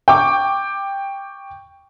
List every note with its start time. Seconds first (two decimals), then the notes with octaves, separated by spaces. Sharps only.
0.08 G5 C#6 D6